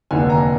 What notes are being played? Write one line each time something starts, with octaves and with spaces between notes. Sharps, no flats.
F1 D#2 D3 G#5
A#5